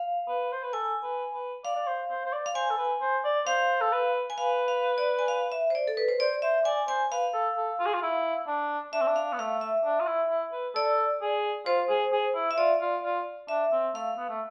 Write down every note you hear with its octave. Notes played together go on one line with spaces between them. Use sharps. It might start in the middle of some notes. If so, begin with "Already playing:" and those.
Already playing: F5
B4
C5
B4
A4 G#5
B4
B4
D5 F5
D5
C5
C5
C5
D5
F5
C5 G#5
A4
B4
C5
D5
C5 F5
A4
B4
G#5
B4 F5
F5
D5
G#5
F5
E5
C5
D5
A4
B4
C5
C5 D5
C5 E5
D5 G#5
C5 G#5
B4 F5
A4
A4
F4
G#4
F4
E4
D4
D4 E5
C4
D4
F5
B3
A3 F5
E5
D4
F4
E4
E4
B4
A4 D5
G#4
F4 C5
G#4
G#4
E4
E5
F4 D5
F4
F4
D4 E5
C4
A3 F5
B3
A3